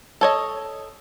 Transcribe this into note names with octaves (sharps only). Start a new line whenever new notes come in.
A4 C#5 D#5